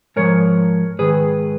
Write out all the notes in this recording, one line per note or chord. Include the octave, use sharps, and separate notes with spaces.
G#2 F3 A#4 C#5
G#2 D#3 G#4 B4